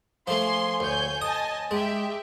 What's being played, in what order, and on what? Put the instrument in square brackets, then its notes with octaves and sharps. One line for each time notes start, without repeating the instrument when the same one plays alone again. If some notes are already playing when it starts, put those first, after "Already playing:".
[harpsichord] F3 A3 [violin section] G#5 C6
[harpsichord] D2 [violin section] C#5 G#5 G6
[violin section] D#5 G#5 A5 [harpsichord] D#6
[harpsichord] G#3 [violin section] G4 E5